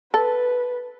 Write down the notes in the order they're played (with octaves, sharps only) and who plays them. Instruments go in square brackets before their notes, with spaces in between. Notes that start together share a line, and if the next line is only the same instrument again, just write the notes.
[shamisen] A4 [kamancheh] B4